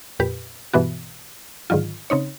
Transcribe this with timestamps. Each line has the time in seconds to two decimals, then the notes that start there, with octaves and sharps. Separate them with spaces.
0.20 F2 A#2 G4 B4
0.74 G2 B2 E3 B3 F#4
1.70 G#2 D3 D#3 F#3 F4
2.10 C#3 C4 D#4 C#5